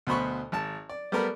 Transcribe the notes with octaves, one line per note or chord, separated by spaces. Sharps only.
D2 B2 C5 B5 C#6
G#1 A5
D5
G3 A3 B3 A#4 B5